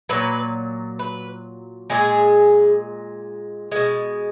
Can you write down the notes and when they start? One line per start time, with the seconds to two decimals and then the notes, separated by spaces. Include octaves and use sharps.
0.09 A#2 F#3 B4
0.99 B4
1.90 A#2 G#3 G#4
3.71 B2 G#3